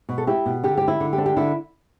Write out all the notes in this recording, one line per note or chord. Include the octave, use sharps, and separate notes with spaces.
B2
A4
E4 G4
B2
D3 G4
D3 G4
E4
D3
G4
D4
G4
D3 E4